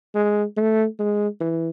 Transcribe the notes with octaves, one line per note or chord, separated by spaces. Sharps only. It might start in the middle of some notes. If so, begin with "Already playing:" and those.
G#3
A3
G#3
E3